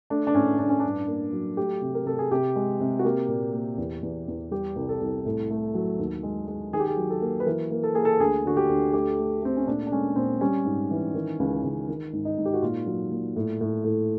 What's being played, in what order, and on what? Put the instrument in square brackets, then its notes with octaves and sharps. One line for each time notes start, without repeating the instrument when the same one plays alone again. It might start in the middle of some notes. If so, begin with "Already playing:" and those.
[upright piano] A3 D4
D4
A2 C#4
A2 D4
C#4
G2 D4
A#3
F#3
A3 G4
C3
A#4
C3 A4
G#4
C3 G4
G#3
C3
F#4
A#3 G4
A#2
A#3
E2
E2
E2
G3 G4
C2
A4
C2
A2
A3
F#3
D#2
G#3
G#3
D#3 G#4
G4
G#4
F#3
A4
A#3
B4
E3 A#4
A#3
A4
A#3 G#4
A4
D2 G#4
D3 F#4
G4
D2
A3 G4
A3
A3 C4
C#4
A#2 D4
D4
G#3 C#4
A#2 C4
G3 C#4
G#2
E3
D#3
C#2
C#2
D#3
G#2
D#4
G#2
G4
F#4
A#2 F4
F#3
A#2
A2
A2
A2